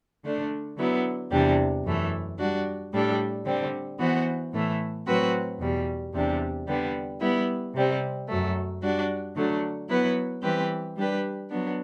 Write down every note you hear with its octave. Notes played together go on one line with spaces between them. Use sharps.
D3 A3 D4
D3 F#3 B3 E4
E2 C3 E3 G3 D4
F#2 E3 A3
G3 D4 F#4
A2 G3 D4 A4
D3 G3 C4
E3 B3 F#4 C5
A2 E3 A3
A2 F#3 C4 F#4 B4
E2 B2 G3
E2 C3 G3 D4
D3 G3 B3
G3 B3 E4
C3 G3 C4
F#2 F#3 A3
G3 D4 F#4
D3 F#3 A3 D4
F#3 B3 E4 B4
E3 G3 C4 G4 B4
G3 D4 G4 B4
F#3 B3 D4